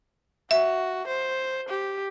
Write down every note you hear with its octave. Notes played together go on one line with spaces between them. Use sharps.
F#4 E5
C5
G4